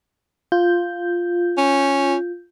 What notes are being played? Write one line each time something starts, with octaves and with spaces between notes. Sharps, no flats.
F4 G6
C#4